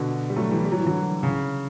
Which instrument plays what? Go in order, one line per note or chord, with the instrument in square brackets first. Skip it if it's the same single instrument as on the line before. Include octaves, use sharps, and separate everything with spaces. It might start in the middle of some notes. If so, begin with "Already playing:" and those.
Already playing: [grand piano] B2 D3
G3
F#3 A3
E3 G3
G3
F#3
E3
D3 F#3
C#3